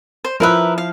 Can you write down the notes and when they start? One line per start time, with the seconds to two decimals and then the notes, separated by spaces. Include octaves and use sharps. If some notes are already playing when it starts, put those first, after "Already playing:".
0.24 C5
0.40 F3 E4 A#4 B4 E5 F#6
0.78 F5